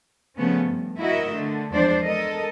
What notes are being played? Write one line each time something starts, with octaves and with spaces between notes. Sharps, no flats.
C#3 F3 A3 B3 C#4
G2
E4 F#4 A#4 D#5 E5
D3 A3
E2 F3 G#3 D4 C5 D5
G#3 A4 A#4 D#5